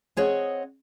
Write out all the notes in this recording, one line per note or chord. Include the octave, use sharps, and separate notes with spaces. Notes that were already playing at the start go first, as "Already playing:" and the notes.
C4 G#4 C#5 D#5 F#5